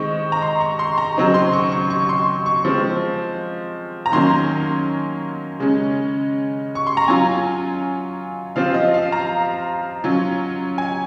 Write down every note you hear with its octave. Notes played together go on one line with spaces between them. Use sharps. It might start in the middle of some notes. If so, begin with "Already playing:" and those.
Already playing: D#3 G#3 C4 D#4 C#6
A#5
C6
C#6
C6
A#5
C#3 F#3 C4 D#4
C6
C#6
C#6
C#6
C6
C#6
F3 G#3 C4
A#5
D#3 F#3 A#3 C#4 C6
C#3 G#3 C#4
C#6
C6
A#5
F#3 C#4 F4 G#5
F3 C4 F4 F5
D#5
F5
A#5
F#3 C#4 F4
G#5